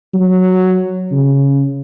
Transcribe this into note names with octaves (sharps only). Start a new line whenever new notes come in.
F#3
C#3